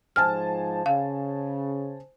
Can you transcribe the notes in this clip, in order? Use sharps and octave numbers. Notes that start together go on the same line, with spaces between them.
G#2 F3 C5 G#5 A5 F6
C#3 F5